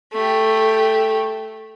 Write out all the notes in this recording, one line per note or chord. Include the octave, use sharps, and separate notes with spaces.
A3 G4